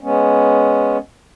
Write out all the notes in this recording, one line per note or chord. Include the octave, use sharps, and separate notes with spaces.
G#3 B3 C#4